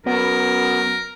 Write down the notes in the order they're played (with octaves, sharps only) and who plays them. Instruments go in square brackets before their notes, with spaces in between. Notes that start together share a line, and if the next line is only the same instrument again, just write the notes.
[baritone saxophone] F#2 [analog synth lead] B3 [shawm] A#4